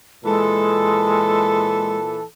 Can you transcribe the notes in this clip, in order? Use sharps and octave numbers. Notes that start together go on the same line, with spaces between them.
A#2 E3 G#3 A4